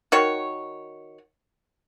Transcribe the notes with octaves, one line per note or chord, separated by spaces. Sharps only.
D#3 F#4 C#5